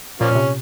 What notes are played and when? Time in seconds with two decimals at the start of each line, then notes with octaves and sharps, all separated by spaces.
0.20 A#2 F3 A#3 C#4
0.31 A#2
0.35 C3